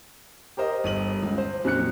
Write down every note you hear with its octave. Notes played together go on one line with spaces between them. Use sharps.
G4 A#4 C5 D#5
G1 D#7 F#7
C#2
C5
F2 A#2 F#3 F#6 C#7